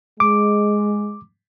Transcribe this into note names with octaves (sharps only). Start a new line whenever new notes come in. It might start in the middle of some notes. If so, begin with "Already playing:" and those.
G#3 D6